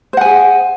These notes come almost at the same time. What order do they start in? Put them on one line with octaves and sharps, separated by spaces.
C5 F#5 G#5 G#4